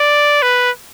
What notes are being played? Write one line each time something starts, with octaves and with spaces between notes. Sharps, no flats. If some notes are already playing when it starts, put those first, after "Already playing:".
Already playing: D5
B4